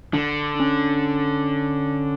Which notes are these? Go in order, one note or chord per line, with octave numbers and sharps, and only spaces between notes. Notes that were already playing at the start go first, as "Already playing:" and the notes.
D3 D4
C#4